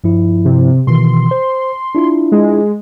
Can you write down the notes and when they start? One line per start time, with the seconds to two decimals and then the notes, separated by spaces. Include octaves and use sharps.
0.04 G2 F3 E4
0.45 C3
0.87 B2 D#3 E3 C6
1.31 C5
1.95 D4 E4 F4
2.32 G#3